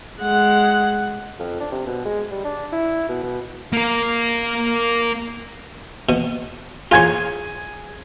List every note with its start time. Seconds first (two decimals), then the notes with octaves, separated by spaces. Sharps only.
0.21 G#3 F#5
1.40 F2
1.60 D4
1.72 C3
1.87 B2
2.05 G#3
2.31 G3
2.44 D4
2.72 E4
3.09 B2
3.24 B2
3.73 A#3 A#4
6.09 B2
6.91 F4 G#4 C#5 G#5 G#6